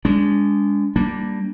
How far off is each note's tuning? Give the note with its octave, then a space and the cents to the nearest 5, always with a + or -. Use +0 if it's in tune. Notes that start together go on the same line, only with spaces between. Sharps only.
G#3 -20 D4 -30
G3 +0 A#3 +0 D4 +0